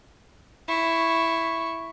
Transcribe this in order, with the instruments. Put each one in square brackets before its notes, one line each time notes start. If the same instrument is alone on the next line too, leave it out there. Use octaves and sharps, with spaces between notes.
[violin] E4 C#6